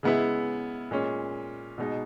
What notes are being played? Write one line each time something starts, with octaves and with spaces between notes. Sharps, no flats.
C#3 G#3 B3 E4
A#2 G#3 C#4
B2 G#3 D#4